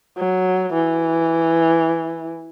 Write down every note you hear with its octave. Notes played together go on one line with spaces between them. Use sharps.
F#3
E3